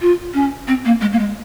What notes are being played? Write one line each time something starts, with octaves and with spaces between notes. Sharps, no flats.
F4
C#4
C4
A#3
G#3
A#3
G#3